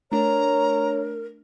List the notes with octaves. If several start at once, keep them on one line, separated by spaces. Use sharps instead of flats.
A3 D4 A#4 C#5 A#5